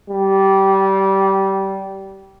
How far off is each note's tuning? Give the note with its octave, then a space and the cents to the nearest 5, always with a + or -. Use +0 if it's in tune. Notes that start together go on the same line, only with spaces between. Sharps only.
G3 -20